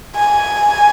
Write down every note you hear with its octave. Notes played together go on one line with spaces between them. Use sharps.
G#5